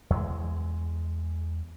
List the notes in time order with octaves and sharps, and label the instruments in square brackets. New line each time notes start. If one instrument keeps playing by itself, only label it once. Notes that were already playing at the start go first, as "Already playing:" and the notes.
[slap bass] E2 G#3